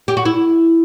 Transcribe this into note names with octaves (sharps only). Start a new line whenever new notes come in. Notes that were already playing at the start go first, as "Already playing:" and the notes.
G4
F#4
E4